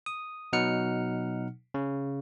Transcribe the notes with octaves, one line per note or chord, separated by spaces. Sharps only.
D#6
B2 F#3 D#4 F#5 F6 C#7
C#3